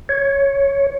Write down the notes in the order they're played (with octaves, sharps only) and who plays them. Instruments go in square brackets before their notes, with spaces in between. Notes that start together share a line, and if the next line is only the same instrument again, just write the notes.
[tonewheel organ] C#5